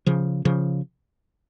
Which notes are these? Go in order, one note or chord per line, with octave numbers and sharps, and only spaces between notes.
C#3 F3
C#3 F3